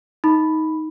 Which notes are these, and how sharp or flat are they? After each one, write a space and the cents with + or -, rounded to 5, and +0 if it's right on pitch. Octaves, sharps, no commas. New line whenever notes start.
D#4 +15 B5 +0